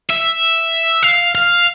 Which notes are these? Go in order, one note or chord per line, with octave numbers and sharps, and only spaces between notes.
E5
F5
F5